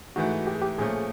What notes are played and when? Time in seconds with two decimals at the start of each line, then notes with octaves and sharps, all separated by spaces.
0.16 G#2 E3 A3 F#4
0.47 G4
0.55 G#4
0.62 G4
0.78 A#2 F3 A3 C#4 G#4